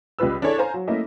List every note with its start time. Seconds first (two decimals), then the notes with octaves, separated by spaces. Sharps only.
0.19 C#2 G3 F4 B4 E6
0.42 D4 E4 G#4 A4 C#5
0.58 C5 F5 G#5 A#5
0.74 F#3
0.88 A3 A#3 C#4 E4 D#5 E5